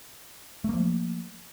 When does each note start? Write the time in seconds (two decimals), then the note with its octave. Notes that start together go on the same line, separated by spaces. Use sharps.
0.64 A3
0.69 A#3
0.74 F3